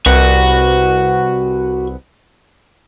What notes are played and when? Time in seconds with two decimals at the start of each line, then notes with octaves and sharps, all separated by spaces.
0.06 C2 F#4 B4 F#5